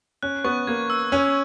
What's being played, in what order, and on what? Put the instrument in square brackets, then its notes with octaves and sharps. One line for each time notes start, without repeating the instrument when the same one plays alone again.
[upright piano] C#4 [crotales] F#6
[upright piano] B3 [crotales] C#6
[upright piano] A#3 [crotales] G#6
[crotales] E6
[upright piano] C#4 [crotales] F#6